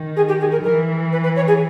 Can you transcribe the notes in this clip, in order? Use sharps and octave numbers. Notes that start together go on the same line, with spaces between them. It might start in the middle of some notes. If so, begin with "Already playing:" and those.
Already playing: D#3
G#4
G4
G#4
A#4
E3 A#4
B4
B4
C#5
G#4